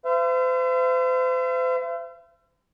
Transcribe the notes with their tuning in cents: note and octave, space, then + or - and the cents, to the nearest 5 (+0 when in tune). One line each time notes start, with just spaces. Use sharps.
C5 -40 E5 +45